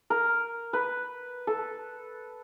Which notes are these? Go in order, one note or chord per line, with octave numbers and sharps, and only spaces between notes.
A#4
B4
A4